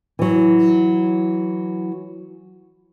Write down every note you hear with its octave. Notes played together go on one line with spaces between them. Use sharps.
E3 F#3